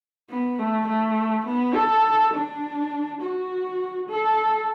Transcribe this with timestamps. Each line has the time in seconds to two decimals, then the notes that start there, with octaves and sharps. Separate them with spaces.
0.30 B3
0.59 A3
0.88 A3
1.47 B3
1.75 A4
2.34 D4
3.22 F#4
4.10 A4